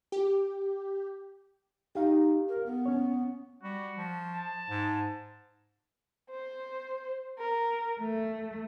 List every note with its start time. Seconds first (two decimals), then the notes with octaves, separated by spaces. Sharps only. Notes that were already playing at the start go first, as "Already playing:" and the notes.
0.12 G4
1.95 D#4 G4 F5
2.49 A#4
2.66 B3
2.86 C#4 C#5
3.63 G3 F#4
3.97 F3
4.33 A5
4.70 G#2
6.31 C5
7.38 A#4
8.00 A3